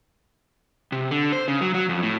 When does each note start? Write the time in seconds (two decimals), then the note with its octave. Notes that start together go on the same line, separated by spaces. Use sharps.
0.92 C3
1.11 D3
1.33 C5
1.48 C#3
1.61 F#3
1.74 F#3
1.89 F2
2.03 A2